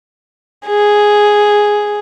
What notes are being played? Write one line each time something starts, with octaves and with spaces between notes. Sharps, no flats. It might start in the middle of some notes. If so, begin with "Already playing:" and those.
G#4